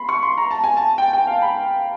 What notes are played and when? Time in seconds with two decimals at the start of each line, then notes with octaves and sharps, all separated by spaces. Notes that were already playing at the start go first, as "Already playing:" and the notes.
Already playing: B5 C6
0.09 C#6
0.23 C6
0.38 A#5
0.51 A5
0.64 G#5
0.77 A5
0.98 G5
1.13 G5
1.27 F5
1.42 B5